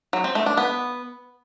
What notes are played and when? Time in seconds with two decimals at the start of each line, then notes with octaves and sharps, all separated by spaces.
0.13 F#3
0.24 C4
0.35 A3
0.46 D4
0.57 B3